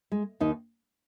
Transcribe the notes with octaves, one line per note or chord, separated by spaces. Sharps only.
G#3
D#2 D#4